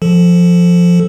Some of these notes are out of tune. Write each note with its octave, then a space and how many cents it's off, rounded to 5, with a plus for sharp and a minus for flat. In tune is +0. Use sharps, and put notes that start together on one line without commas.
F3 +0 A4 +0